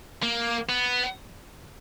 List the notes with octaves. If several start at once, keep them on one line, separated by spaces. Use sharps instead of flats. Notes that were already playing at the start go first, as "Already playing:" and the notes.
A#3
B3